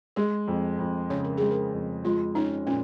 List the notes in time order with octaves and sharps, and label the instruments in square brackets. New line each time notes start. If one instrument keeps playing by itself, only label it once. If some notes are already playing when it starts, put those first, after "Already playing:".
[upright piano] G#3 [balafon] G#4
[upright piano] F2
F2
[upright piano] C#3 [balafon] C#5
[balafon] A#4
[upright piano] G#3 [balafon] G#4
[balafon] A#4
[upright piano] F2
[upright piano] G#3 [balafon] F4
[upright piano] C#4 [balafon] D#4
[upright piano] A#2 [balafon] C#4